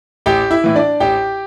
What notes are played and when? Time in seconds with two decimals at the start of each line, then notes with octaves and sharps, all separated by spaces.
0.26 A1 G4 G5
0.51 E4 E5
0.64 A2 E3
0.76 D4 D5
1.00 A1 G4 G5